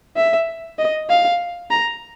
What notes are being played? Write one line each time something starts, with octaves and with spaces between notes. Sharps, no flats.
E5
D#5
F5
A#5